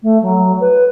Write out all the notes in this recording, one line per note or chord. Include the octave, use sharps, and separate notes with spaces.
A3
F#3
B4